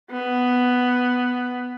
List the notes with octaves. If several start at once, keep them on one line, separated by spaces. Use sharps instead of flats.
B3